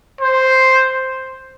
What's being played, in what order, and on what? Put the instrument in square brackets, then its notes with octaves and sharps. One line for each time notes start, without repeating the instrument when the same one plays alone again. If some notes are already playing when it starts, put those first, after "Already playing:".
[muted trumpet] C5